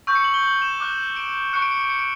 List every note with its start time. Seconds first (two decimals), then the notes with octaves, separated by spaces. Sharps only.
0.07 C#6 E6 G6
0.15 C#7
0.24 F#7
0.34 G7
0.43 F#7
0.62 E7
0.80 D6 F#6
1.16 D7
1.53 C#6 F#6 C#7
1.62 D7
1.71 C#7
1.81 D7
1.90 C#7
1.99 D7